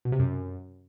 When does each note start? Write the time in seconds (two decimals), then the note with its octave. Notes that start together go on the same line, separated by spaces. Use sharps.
0.05 B2
0.12 C3
0.19 F#2